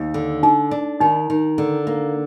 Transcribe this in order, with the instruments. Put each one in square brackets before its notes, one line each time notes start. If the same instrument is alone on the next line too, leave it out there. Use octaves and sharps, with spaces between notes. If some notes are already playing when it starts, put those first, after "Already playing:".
Already playing: [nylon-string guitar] D#2
D3
[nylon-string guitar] D4 [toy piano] D#4
[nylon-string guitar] D4
[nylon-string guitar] D#3 [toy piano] D#4
[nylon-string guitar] D#3
D3
A#3